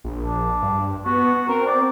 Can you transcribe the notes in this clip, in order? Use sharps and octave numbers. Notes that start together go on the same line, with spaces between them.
A#1
D4
G2
B3 F#4
C4 A#4
D5